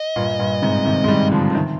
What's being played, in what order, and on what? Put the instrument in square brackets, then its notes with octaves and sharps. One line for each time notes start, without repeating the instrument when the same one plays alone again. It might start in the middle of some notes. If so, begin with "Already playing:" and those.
Already playing: [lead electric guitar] D#5
[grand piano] G2 A#2
G2 A#2
G#2 C3
C3 D#3
G#3
D#3 G3
D3 F3
D3
C3 D#3